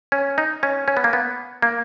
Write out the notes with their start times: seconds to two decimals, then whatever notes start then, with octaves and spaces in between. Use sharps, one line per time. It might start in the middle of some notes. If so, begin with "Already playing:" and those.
0.12 C#4
0.38 D#4
0.63 C#4
0.88 C#4
0.97 B3
1.04 A#3
1.13 B3
1.62 A#3